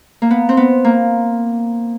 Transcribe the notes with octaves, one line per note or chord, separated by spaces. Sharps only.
A#3
B3
C4
B3
A#3